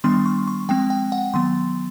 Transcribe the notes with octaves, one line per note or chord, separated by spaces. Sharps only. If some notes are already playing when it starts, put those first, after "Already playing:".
D#3 G3 B3 D4 C6
C#6
C#6
F3 G#3 C4 G5
G5
F#5
D#3 F#3 B3 C6